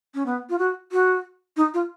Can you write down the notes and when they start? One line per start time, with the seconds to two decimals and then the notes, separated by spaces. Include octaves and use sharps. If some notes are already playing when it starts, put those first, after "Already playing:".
0.14 C#4
0.26 B3
0.50 F4
0.59 F#4
0.92 F#4
1.57 D#4
1.74 F4